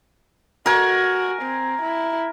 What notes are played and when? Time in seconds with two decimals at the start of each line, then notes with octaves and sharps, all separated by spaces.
0.66 F#4 A#4 G#5
1.42 C4
1.82 E4